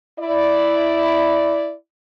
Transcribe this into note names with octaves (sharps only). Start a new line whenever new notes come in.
E4 D5